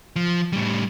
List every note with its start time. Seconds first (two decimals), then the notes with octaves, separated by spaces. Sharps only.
0.16 F3
0.53 A2 G3